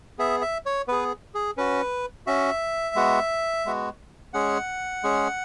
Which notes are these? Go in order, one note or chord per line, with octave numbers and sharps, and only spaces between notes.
B3 G#4 E5
E5
C#5
B3 G#4 B4
G#4
C#4 F#4 B4
C#4 F#4 E5
G#3 B3 F#4
G#3 B3 F#4
G#3 C#4 G#4 F#5
G#3 C#4 G#4